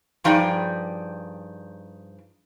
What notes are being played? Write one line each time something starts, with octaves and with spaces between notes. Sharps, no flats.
G2 F3 D#4 G#4 D5 G5